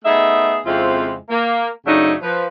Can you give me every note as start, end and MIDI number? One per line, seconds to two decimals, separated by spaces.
0.05 0.57 57
0.05 0.57 59
0.05 0.57 63
0.05 0.57 68
0.05 0.57 76
0.65 1.15 41
0.65 1.15 49
0.65 1.15 56
0.65 1.15 60
0.65 1.15 64
0.65 1.15 65
1.29 1.68 58
1.85 2.13 42
1.85 2.13 49
1.85 2.13 54
1.85 2.13 57
1.85 2.13 62
1.85 2.13 63
2.22 2.45 53
2.22 2.45 71